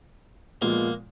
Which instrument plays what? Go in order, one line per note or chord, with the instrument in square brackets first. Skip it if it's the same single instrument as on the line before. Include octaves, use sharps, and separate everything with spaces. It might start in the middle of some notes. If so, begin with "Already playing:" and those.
[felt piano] A#2 F3 G#3 B3 F4 [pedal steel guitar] A#3